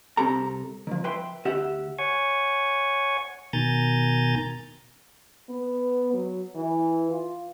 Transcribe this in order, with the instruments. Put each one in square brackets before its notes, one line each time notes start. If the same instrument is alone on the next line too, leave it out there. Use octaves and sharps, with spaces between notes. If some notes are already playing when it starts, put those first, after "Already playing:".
[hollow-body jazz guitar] C2 C4 G4 A4 A#5
D#3 F3
B4 E5 G5 C6
D2 G4 E5 F#5
[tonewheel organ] C#5 F#5 G#5 C#6
B2 D#3 G#5 A#5 G6 A6
[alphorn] B3
F#3
E3
F4